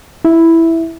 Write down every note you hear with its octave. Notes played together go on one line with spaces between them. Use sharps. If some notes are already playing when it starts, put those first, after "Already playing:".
E4